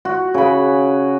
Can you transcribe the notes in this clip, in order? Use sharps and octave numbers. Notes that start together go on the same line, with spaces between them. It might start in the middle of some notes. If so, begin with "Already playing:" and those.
F#4
C#3 B5